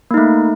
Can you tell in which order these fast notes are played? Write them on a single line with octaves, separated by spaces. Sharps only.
A#3 D#4 A3